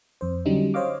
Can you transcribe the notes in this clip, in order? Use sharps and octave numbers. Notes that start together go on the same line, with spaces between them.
F2 C5
D3 F#3 G3 C#4 D#4
C5 C#5 D#5 F5 D6